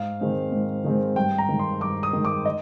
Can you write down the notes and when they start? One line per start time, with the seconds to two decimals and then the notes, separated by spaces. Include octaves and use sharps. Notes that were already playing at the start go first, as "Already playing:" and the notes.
Already playing: G#2 F5
0.20 D#3 G#3 C4
0.52 G#2
0.84 D#3 G#3 C4
1.16 G2 G5
1.38 A#5
1.49 D#3 G#3
1.59 C6
1.81 G2 D6
2.03 D#6
2.13 D#3 G#3
2.25 D6
2.45 D#5